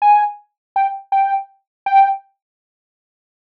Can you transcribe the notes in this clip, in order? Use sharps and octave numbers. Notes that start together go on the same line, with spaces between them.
G#5
G5
G5
G5